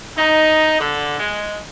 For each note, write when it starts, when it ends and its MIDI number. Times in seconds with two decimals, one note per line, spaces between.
0.17 0.78 63
0.80 1.18 50
1.20 1.59 56